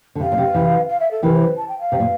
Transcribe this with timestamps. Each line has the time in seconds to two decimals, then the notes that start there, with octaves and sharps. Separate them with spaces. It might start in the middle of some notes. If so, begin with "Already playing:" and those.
0.15 D3
0.20 C3 F5
0.32 A#2
0.38 C3
0.54 C3 E3
0.89 F5
1.00 E5
1.11 A4
1.23 C3 E3 A#4
1.34 C5
1.57 A5
1.69 G5
1.80 F5
1.92 C3
2.00 A#2